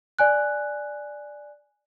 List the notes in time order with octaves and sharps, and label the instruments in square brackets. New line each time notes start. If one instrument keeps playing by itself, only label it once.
[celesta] D5 G#5 F#6